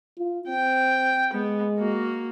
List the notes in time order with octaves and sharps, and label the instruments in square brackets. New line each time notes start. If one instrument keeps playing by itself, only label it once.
[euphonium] F4
[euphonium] C4 [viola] G5
[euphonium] G#3 [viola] B3
[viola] A#3 F#4